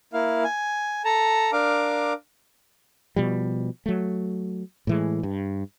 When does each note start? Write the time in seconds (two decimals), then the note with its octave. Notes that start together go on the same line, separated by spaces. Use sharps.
0.13 A#3 E4 F5
0.44 G#5
1.05 A4 A5 A#5
1.53 D4 A#4 F5 D6
3.16 B2 F3 G3
3.86 F#3 A3
4.87 A2 E3 G#3
5.23 G2